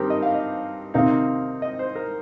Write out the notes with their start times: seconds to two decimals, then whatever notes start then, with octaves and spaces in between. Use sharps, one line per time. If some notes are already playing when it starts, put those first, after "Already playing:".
Already playing: G2 D#3 C4 D#4 G4 A#4
0.10 D#5
0.23 F5
0.35 D#5
0.94 C3 D#3 C4 D#4 F5
1.62 D#5
1.79 C5
1.96 A#4